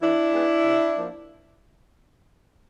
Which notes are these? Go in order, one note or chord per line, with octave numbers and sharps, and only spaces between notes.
E3 D4 E4
G#3 B3
C3
F3 A#3